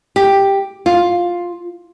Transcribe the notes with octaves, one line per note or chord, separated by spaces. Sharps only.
G4
F4